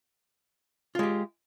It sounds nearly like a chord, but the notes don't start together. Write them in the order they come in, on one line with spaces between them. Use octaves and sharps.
F4 G#3 G4